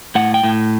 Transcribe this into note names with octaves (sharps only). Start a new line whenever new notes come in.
A2 F#5
G5
A2